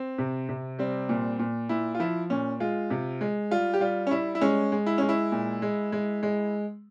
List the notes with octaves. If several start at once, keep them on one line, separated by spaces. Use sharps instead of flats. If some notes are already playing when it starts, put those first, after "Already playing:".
Already playing: C4
C3
C3
G3 C4
A#2
A#2
A#2 E4
F4
F3 E4
A#2 C#4
G#3 F4
C3
G#3
G3 F4
G4
G3 F4
C#4
G3 E4
E4
G#3 C#4
G#3
E4
G#3 C#4
E4
A#2
G#3
G#3
G#3